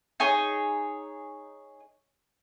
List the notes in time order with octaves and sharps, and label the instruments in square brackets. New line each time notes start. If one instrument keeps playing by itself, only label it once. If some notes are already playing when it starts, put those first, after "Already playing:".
[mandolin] D#4 G#4 C#5